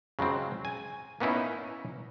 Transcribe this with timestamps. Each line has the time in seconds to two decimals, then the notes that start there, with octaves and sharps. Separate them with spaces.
0.19 C#3 F#3 G#3 C4
0.65 G#5
1.20 A#3 B3 C#4 D#4 E4